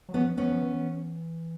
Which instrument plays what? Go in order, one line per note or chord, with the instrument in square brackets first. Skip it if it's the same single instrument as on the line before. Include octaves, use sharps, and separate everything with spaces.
[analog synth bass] F#3
[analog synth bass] F3 [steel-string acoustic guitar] B3 C#4
[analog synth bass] F3 [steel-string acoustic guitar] B3 C#4
[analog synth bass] F3
E3